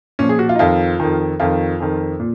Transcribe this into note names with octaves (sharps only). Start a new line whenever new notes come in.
A#2 F3 C#4
G#4
F#4
F4
D#4
F2 D#3 F4
F2 D#3
F2 D#3 F4
F2 D#3
A#2